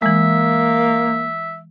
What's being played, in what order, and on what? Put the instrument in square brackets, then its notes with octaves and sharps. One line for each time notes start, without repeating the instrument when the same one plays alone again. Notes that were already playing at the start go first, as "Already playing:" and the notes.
[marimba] E3 G#3 [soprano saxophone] A#3 [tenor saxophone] E5